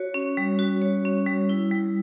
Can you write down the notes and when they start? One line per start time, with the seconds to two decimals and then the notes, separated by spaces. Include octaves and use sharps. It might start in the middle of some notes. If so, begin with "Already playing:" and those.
Already playing: F#4 C#5
0.14 C#4
0.37 G3
0.59 F#4
0.82 C#5
1.05 C#4
1.26 G3
1.49 E4
1.71 G3